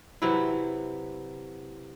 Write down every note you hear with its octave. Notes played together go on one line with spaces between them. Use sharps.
C3 E3 F#3 E4